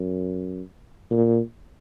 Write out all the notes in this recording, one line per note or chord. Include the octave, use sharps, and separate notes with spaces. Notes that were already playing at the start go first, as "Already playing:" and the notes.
Already playing: F#2
A#2